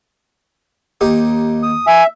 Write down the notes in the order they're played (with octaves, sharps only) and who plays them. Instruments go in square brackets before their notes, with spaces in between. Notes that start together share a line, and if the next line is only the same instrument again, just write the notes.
[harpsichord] D#2 D#4 G4
[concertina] D#6
[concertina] E5 [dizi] G#5